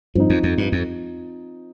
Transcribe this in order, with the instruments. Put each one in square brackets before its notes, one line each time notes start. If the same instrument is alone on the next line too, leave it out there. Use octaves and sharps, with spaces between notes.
[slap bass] G2 [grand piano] F3 C4 D#4
[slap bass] F2
F2
G2
F2